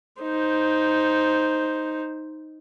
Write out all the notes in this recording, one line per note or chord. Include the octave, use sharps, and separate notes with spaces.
D#4 C5